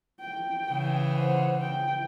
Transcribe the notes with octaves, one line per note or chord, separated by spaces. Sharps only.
G5
C#3 E3
C5 F#5
G5